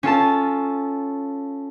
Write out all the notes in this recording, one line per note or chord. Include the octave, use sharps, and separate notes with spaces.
C#4 F4 A4 A5